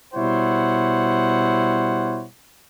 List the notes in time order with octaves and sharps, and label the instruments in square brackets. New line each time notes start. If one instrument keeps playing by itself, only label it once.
[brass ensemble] B2 G3 E4 C5 C#5 F#5